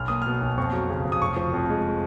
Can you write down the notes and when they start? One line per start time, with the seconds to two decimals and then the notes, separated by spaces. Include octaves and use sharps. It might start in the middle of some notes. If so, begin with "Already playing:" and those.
Already playing: B1 F6
0.08 A#3 D#6
0.22 B2 F6
0.41 B1
0.57 F2 C#6
0.73 F#3
0.90 C#3
1.05 F2
1.12 D#6
1.21 F1 C#6
1.37 F3
1.54 F2
1.70 G#3